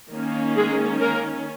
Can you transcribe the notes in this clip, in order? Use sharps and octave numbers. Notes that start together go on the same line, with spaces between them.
D#3 A#3 C#4
G#3 G#4
A#3 A#4